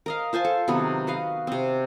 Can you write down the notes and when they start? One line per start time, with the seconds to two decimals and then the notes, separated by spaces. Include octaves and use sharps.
0.06 A#4 D#5 F5
0.33 F4 C5 G#5 A5
0.45 A4
0.68 C3 D#3 F#3 B3
1.07 F#4 B4 D#5 F5
1.47 C3 C4